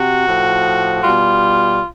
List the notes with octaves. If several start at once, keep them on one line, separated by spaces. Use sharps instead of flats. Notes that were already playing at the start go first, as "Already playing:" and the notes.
Already playing: C3 F#4
A2 F3
B2 G3 F4